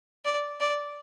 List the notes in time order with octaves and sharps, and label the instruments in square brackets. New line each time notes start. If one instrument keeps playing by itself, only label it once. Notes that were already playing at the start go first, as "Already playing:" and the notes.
[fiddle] D5
D5